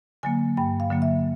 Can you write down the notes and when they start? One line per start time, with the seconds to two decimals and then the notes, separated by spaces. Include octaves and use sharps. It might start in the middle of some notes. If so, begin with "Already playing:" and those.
0.23 D3 F#3 A#3 G#5
0.57 G2 G5
0.80 F5
0.91 D3 F#3 A#3
1.02 E5